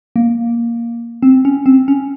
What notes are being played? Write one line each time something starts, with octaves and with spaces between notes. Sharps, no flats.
A#3
C4
C#4
C4
C#4